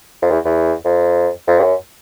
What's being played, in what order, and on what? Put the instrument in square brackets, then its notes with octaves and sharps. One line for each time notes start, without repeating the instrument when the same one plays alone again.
[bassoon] F2
E2
E2
F2
F2
G2
F#2